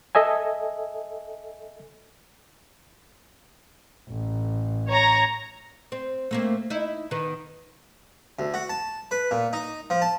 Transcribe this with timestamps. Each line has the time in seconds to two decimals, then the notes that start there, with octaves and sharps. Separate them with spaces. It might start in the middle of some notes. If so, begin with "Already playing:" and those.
0.15 A4 D#5 E5 G#5
4.09 A1
4.88 C#5 A#5
5.92 C4
6.31 A3 A#3 C4
6.70 D#4 E4
7.11 D#3 B3
8.39 D2
8.54 F#4
8.69 A5
9.11 B4
9.31 A#2
9.53 D#4
9.90 F3
10.02 A5